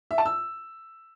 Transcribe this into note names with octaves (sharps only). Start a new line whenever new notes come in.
E5
A5
E6